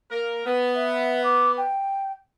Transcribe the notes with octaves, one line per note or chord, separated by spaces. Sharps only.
A#3 A#4
B3
E5
D6
G5